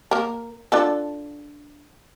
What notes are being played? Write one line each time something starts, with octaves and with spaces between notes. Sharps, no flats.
A#3 A#4
D4 F4 A4